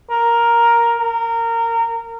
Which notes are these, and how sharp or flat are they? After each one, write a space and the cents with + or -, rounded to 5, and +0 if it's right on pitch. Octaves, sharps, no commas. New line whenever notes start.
A#4 +5
A#4 -20